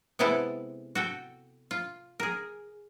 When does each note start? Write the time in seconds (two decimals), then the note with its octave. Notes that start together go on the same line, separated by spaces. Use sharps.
0.19 C3 G#3 B3 E4 A4 B4
0.95 F#4 A4 G5
1.71 F4
2.20 G#4 A#4